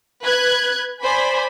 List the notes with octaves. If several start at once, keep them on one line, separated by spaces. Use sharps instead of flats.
B4 F#6 G#6
C5 D5 G#5 B5